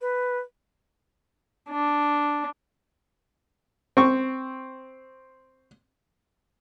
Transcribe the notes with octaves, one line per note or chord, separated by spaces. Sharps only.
B4
D4
C4 C#6